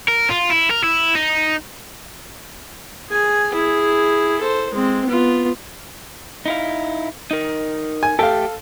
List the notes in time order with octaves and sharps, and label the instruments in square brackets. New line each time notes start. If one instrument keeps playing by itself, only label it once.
[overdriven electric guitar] A#4
F4
E4
A#4
E4
D#4
[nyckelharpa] G#4 G#5
E4 G#4
A4 C5
G#3 C4
B3 F4
[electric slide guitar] D#4 E4 F5
D#4 A#4
[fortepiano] G#5
[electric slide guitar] A3 G4 G5 [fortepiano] A4 F5